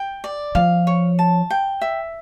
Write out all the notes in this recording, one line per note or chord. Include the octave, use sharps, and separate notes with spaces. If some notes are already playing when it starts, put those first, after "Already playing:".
Already playing: G5
D5
F3 F5
C#5
A5
G5
E5